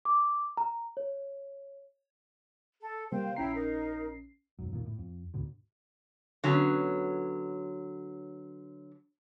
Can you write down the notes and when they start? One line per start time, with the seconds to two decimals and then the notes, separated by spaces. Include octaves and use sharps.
0.05 D6
0.57 A#5
0.97 C#5
2.81 A4
3.12 C3 G3 A#3 C5 F5 G5
3.36 A#1 C#4 E4 G5 A#5 C7
3.55 D#4 A#4
4.59 E1 B1 F#2
4.72 E1 A#2 D3 D#3
4.86 A2
4.99 F2
5.34 D2 G#2 B2 D3
6.44 D3 F#3 B3 C#4